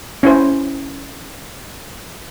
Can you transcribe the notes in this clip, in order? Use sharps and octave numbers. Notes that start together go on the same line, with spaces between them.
C#4 E4 C5